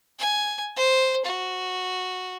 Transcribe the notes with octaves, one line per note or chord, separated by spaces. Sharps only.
G#5
C5
F#4